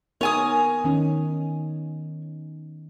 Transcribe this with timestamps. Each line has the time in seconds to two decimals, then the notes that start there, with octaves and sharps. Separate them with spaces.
0.21 B3 D#4 A#4 C#5 G#5 D#6
0.84 D#3 C#4 D#4